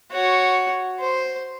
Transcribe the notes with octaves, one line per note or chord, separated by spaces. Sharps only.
F#4 C#5
C5